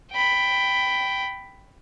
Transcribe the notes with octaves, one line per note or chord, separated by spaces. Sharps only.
G5 B5